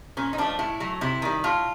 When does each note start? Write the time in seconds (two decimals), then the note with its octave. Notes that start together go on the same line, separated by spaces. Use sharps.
0.17 A#2 C#4
0.33 D#4
0.38 F3 A3 D4
0.59 A2 E4
0.80 F#3 A3
1.01 C3 E4
1.22 D#3 G3
1.44 A2 F4